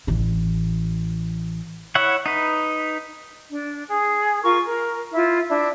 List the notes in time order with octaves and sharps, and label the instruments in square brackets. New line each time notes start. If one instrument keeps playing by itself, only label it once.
[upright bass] A1 E3
[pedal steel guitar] E4 C#5 E5 F#5
D#4 B4
[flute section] D4
G#4
F4 A#4 C#6
A#4
E4 F4
D4 E4